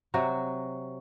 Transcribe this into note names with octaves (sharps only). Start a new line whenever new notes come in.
C3 F#3 F#4